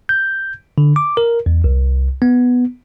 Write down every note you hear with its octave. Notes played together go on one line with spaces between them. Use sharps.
G6
D3
D6
A#4
E2
C2
B3